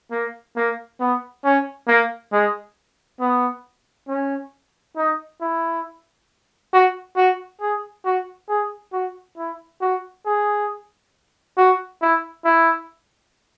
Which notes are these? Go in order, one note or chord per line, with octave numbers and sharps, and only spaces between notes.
A#3
A#3
B3
C#4
A#3
G#3
B3
C#4
D#4
E4
F#4
F#4
G#4
F#4
G#4
F#4
E4
F#4
G#4
F#4
E4
E4